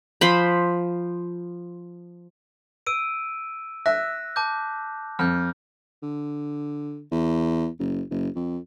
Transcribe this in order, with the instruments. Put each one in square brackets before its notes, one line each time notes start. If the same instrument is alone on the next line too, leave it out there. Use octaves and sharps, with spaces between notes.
[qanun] F3 C5 B5
[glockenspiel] E6 D7 D#7
[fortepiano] E5 [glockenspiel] F#6 A#6
[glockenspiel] A5 D6 G6
[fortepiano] F2 [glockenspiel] F6 G6
[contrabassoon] D3
E2
F#1
F#1
F2